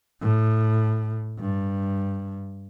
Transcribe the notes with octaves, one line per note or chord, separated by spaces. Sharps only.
A2
G2